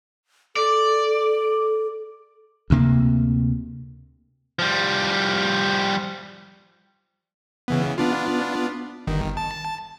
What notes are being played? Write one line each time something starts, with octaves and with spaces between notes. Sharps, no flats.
A4 D5
D2 C3 A#3
F3 G3
C#3 E3 B3
B3 D4 F4
G1 D#3
A5